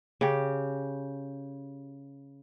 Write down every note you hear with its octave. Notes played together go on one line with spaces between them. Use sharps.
C#3 G4